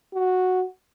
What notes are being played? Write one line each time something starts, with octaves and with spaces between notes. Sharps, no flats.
F#4